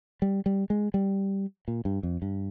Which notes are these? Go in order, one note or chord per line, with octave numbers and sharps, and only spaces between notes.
G3
G3
G#3
G3
A#2
G2
F2
G2